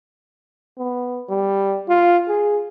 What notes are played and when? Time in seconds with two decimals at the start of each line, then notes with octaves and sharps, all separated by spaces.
0.78 B3
1.29 G3
1.89 F4
2.28 G#4